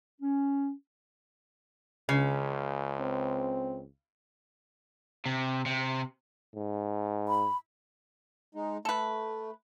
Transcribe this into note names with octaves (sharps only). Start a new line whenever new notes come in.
C#4
C#2 C#3
C4
C3
C3
G#2
B5
G#3 D#4
A3 A4 B4